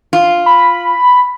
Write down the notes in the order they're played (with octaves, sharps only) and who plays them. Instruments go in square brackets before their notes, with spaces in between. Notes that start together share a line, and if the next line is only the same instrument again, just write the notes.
[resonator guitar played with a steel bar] F4
[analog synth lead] B5